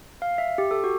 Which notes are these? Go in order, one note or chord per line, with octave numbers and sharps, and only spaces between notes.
F5
E5
G4
A4
F#4